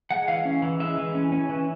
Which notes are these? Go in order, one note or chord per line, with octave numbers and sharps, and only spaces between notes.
G#3 F#5
E3 F5
C#4
E3
G#3 E5
E3
C#4
C#4
E3